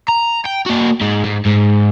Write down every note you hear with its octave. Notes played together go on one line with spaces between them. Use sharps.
A#5
G5
A#3 F#4
G#2 G#3
G#2
G#2